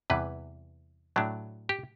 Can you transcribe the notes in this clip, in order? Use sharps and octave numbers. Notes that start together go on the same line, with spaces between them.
E2 C3 E3 G3 B4
A2 F#3 A3 D4
G4